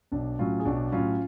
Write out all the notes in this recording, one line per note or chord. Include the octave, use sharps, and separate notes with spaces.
B1 D4
A2 F#3 C#4 F4
G#4
B1 D4 F#4
A2 F#3 C#4 F4